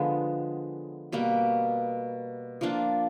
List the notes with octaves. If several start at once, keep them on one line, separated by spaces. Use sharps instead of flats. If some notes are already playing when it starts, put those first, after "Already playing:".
Already playing: D3 F3 G#3 B3
B2 G3 A#3
F3 A#3 D4 F4